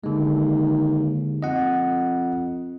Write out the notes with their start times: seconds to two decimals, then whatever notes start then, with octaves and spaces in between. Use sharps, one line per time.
0.04 D#2 D3 G#3
1.43 F2 D#5 F#5